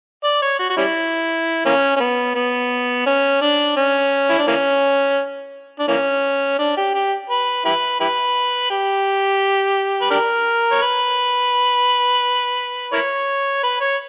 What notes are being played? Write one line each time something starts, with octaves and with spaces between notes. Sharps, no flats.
D5
C#5
F#4
F#4
G3 C#4 E4
E3 A#3 C#4
C#4
B3
B3
C#4
D4
C#4
E4
D4
E3 A#3 C#4
D4
E3 A#3 C#4
D4
G4
G4
B4
E4 G4 B4
E4 G4 B4
G4
B4
D4 G4 A#4
C#5
B4
E4 A#4 C#5
B4
C#5